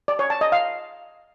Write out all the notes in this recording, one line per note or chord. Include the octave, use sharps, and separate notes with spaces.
D5
C#5
A5
D#5
F5